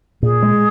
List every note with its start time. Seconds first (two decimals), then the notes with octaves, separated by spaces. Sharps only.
0.22 A#2 G#4
0.43 G#3